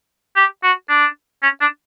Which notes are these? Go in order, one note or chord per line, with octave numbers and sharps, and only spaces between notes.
G4
F#4
D4
C#4
D4